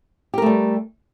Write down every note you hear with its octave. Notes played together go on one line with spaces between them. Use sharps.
G3 A3 G4 A#4